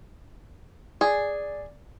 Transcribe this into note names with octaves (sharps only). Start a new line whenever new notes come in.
G#4 D5